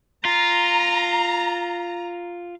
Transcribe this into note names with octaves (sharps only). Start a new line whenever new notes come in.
F4 A#5